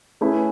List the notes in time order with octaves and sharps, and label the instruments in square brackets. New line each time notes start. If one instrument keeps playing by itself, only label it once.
[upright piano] A3 C#4 E4 G#4 B4